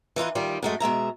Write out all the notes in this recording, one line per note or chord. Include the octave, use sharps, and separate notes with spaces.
E3 D#4 F4 B4
D#3 G3 F4
F#2 G#3 A3
B2 G#3 E5 A#5